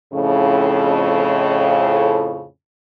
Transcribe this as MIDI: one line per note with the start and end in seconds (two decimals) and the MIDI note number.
0.13 2.45 41
0.13 2.45 45
0.13 2.45 49